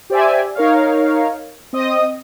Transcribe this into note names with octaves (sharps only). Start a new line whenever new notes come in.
G4 C5 D5 E5 G#5
D#4 A#4 C#5 F5
C4 D#5 D#6